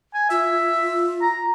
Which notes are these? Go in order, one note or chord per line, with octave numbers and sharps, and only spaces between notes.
G#5
F4 E5
A#5